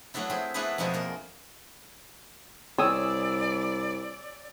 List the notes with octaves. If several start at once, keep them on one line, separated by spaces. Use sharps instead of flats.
F#3 A3 B3 D4 E4
C4 E4 G#4 G5
A3 B3 D4 E4 G#4 B4
F2 B2 F3 G#3 A#3 G#5
A#3 A#4
C2 C#5 D5 G#5 D#6 E6